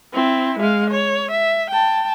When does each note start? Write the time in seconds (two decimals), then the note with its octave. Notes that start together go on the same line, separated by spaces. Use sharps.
0.14 C4 E4
0.60 G#3 F5
0.90 C#5
1.31 E5
1.70 G5 A5